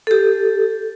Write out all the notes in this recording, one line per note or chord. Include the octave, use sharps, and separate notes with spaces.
G4 A4